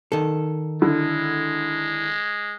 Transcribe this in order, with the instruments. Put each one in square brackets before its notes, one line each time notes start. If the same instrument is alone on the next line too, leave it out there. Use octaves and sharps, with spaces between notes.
[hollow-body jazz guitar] D#3 A4
[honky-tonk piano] D3 [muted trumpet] G#3 [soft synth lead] E4